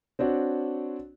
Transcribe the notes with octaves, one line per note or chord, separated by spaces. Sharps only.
C4 D4 F#4 C#5